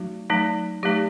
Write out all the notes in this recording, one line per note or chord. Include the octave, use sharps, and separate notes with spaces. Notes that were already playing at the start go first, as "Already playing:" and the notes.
Already playing: F#3 A3 D#4 F#4
F#3 A3 D#4
F#3 A3 D#4 G4